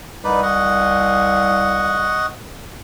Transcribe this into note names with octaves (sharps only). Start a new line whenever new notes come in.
C2 D#4 B4 D5
D#5 F#5 C#6